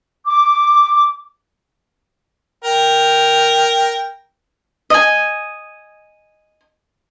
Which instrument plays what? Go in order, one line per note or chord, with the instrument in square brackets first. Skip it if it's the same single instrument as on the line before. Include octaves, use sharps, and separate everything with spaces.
[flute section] D6
[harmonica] A#4 G5
[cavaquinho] D#5 G#5